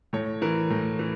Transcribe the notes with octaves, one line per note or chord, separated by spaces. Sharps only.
A2 C#5
E3 A#4
A2
E3